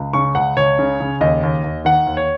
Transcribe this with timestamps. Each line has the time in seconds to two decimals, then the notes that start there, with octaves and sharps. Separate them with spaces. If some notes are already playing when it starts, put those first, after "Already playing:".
Already playing: C#2
0.13 C#3 C#6
0.35 C#2 F#5
0.57 C#2 C#5
0.79 C#3
1.00 C#3
1.21 D#2 D#5
1.43 D#2
1.64 D#2
1.85 D#3 F#5
2.07 D#2
2.17 C#5